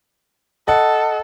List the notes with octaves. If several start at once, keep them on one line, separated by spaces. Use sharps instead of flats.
A4 D#5 F#5